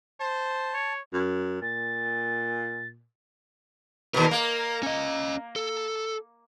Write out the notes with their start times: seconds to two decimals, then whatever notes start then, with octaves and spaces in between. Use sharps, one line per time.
0.20 C5 A5
0.74 C#5
1.13 F#2
1.62 A#2 A6
4.14 D#2 B2 A#4
4.31 A#3
4.83 C#4 D#5
5.56 A4